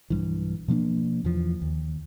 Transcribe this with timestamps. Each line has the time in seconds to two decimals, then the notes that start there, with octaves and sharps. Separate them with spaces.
0.10 B1 G2 E3
0.68 B2 F3 A#3 D4
1.24 E2 E3 F3
1.62 D#2